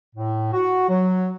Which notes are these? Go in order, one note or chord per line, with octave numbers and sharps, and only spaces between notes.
A2
F#4
F#3